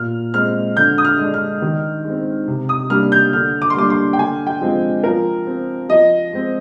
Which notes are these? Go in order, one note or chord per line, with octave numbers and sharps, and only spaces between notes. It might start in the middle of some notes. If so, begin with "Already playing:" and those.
Already playing: A#2 F6
G#3 C4 F6
D3 G6
D#6
F6
G#3 D4
F6
D#3
G#3
C4
C3
D#6
G3 A#3 D4 F6
G6
D3 F6
D6
C6
G3 A#3 D4 D6
C6
G5
D3 G#5
G5
F3 G#3 C4
F3 A#4
C4
F3 D#5
G#3 C4